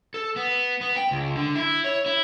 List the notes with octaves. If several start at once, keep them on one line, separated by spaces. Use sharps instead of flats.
A4
B3
B3
G5
C#2
D3
E4
C#5
E4